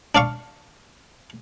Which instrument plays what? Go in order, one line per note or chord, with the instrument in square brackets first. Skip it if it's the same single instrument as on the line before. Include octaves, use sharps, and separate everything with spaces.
[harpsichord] D4 D5 F5 C#6